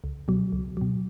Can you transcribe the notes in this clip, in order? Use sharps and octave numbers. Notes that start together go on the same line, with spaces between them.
C#2
B2 F#3
C#2
B2 F#3